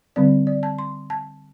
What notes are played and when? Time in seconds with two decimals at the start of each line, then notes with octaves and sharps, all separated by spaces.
0.16 D3 G3 C4 D5
0.47 D5
0.63 A5
0.79 C6
1.10 A5